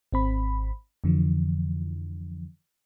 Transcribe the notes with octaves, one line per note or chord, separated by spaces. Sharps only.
G#1 C4 B5
F2 D3 E3 F3